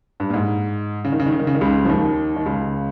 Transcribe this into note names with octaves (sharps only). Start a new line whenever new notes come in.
G2
A#2
G#2
C#3
D#3
C#3
D#3
C#3
D#3
C#3
D#3
C#2 C#3
F3
D#2 D#3
D#3
C#2 C#3